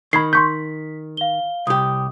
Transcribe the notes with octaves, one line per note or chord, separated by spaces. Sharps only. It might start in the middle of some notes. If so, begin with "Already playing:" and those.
D#3 B5 G#6 C7
C6 C#6 G6 B6
F5 G7
C2 G4 D#6